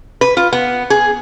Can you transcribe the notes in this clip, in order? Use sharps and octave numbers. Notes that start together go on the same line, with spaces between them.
B4
F4
B3
G#4